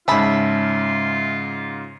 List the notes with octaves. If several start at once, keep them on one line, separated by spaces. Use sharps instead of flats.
G#2 C#3 F4 G#4 E5 A5 B5